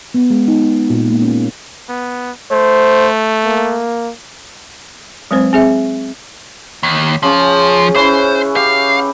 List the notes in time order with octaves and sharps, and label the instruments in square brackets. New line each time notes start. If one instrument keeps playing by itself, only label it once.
[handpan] B3
G#3
D#4
D#4
A#2
A#3
C#4
[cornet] B3
[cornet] A3 [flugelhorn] C5
[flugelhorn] A#3
[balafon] F#3 G#3 C4 B4 C5
C4 G#4 E5
[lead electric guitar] D#2
[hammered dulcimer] C#3 C#4 [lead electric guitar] F3
[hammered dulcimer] C#4 E4 B4 [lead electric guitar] C5
[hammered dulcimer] G4 [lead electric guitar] F5